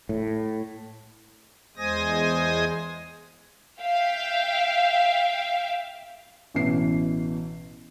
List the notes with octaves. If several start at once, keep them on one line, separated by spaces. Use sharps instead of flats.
A2
E2 G#3 C5 G#5 D#6 A#6
E5 F5 G5
A1 B2 E3 C7